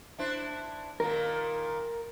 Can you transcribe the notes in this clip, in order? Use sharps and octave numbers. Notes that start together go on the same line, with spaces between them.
D4 E4 C5
A#2 D#3 A#4